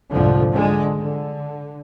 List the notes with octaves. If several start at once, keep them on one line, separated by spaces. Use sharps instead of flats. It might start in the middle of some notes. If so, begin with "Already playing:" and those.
C2 F2 G#2 D3 F3
D3 G#3
D3